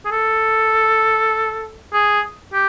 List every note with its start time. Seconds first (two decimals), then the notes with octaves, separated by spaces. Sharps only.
0.05 G#4
0.11 A4
1.93 G#4
2.53 G4